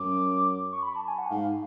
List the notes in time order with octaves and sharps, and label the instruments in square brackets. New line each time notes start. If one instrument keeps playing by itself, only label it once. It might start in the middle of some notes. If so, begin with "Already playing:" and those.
Already playing: [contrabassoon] F#2 [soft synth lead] D6
[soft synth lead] C#6
B5
A5
G#5
F#5
[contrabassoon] G#2 [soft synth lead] F5